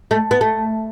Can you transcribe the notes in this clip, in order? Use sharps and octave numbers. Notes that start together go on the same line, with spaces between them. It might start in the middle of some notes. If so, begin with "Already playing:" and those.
A3
B3
A3